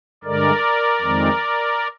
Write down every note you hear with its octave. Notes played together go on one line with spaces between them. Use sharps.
G2 D3 G#3 A#4 D5
F2 D#3 G#3 C4